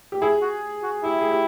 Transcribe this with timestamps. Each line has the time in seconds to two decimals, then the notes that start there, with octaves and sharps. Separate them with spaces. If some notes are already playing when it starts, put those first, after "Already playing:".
0.12 G4
0.21 E4 G#4
0.41 F#4
0.83 F#4
1.03 E4 G4
1.21 G#4
1.31 G4